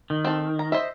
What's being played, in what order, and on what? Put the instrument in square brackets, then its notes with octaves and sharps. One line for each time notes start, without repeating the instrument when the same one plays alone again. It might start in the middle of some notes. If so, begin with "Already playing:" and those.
[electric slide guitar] D#3
[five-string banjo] C4 A4
A#5
C5 D#5 E5